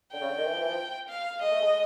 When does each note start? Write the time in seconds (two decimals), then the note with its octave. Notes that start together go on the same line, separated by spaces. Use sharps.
0.12 D3 G5
0.21 C#3
0.29 D3
0.37 D#3
0.46 E3
0.53 F3
0.61 E3
0.68 F3
1.09 F5
1.41 G#3 D#5
1.51 A3
1.62 G#3